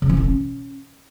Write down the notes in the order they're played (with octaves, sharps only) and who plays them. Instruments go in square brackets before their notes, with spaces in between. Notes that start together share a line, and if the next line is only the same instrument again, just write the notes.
[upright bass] C#3
E3
D3
C#4